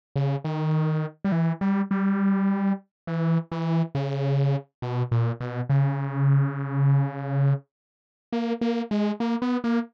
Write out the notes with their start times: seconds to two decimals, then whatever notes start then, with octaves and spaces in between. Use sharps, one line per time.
0.16 C#3
0.45 D#3
1.25 G3
1.32 E3
1.61 G3
1.91 G3
3.07 E3
3.52 E3
3.95 C#3
4.82 B2
5.12 A#2
5.40 B2
5.69 C#3
8.32 A#3
8.61 A#3
8.91 G#3
9.20 A#3
9.42 B3
9.64 A#3